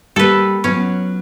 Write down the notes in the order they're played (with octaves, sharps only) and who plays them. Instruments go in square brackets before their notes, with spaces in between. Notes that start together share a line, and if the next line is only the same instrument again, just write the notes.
[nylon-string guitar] G3 A#3 [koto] A4 B4
[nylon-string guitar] F#3 B3 F4 [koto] C#4